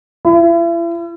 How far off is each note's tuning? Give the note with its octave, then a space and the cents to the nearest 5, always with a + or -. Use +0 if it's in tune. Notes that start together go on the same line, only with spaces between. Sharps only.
E4 +40